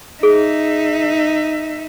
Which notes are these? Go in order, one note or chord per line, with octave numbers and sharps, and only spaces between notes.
D#4 G#4 E5